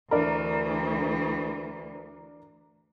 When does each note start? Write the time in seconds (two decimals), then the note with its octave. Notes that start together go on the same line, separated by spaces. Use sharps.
0.11 D2 E3 D4 A#4